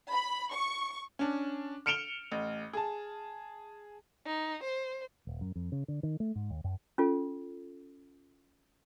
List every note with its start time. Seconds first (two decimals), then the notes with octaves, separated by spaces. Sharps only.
0.12 B5
0.55 C#6
1.19 C#4 D4
1.86 F6 C#7 D7 E7 F7 G7
2.32 A1
2.73 G#4 A5
4.26 D#4
4.64 C5
5.27 D#1
5.41 F#2
5.56 F2
5.72 C#3
5.88 D3
6.03 D#3
6.20 A3
6.35 G#2
6.50 D#2
6.64 F#2
6.98 C#4 F4 A4